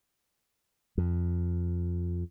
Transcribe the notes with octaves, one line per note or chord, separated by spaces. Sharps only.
F2